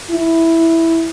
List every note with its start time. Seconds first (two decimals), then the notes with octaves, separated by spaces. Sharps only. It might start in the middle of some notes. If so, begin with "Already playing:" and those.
0.11 E4